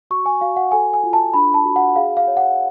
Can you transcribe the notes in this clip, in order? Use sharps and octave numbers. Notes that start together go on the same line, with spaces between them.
F#4 C#6
G#5
F#4 F5
F#5
A4 G#5
G#5
F4
A5
D4 B5
A5
F#4
F#5
G#4 F5
F5
C#5
F#5